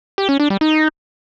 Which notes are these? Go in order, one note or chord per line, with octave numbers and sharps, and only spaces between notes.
G4
C#4
D4
G3
D#4